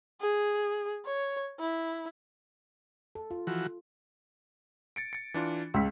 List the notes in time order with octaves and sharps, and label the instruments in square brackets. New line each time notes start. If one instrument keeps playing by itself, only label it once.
[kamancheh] G#4
C#5
E4
[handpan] A4
F4
[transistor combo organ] E3 F3 F#4
[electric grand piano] A6 C#7 D7
A6 C#7
E3 D4 F4
[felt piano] C#2 [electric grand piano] E6 B6